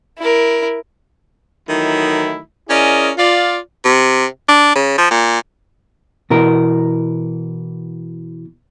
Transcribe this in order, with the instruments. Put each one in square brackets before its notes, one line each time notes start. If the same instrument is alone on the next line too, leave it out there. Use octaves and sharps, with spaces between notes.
[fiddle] E4 A#4
[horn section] D#3 E3 F#3 A3 D#4 E4
C#4 E4 G#4 A#4 D5 D#5
F4 D5
[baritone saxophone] C3
D4
C#3
F3
A#2
[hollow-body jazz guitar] B2 E3 A#4